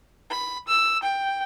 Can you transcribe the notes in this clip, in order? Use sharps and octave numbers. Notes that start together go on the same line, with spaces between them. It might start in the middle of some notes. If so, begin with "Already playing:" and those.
B5
E6
G5